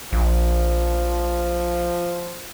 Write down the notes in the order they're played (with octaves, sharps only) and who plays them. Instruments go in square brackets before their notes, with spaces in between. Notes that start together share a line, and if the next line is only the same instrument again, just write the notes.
[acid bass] A#1 [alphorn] F3